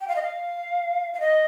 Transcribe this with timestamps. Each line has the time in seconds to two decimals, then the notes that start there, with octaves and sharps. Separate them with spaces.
0.01 G5
0.08 F5
0.16 D#5
0.22 F5
1.14 F5
1.20 D#5